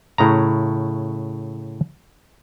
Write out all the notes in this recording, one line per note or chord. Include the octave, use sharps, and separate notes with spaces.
A2 C#3 A#5